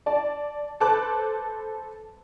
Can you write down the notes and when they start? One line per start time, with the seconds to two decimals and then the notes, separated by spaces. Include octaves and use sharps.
0.06 D5 A5
0.80 A4 B4 C5 A5 D6 F#6